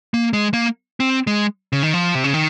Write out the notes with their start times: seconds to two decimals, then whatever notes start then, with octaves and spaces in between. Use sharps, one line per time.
0.14 A#3
0.33 G#3
0.53 A#3
1.00 C4
1.27 G#3
1.73 C#3
1.83 D#3
1.94 F3
2.15 C3
2.24 C#3
2.33 D#3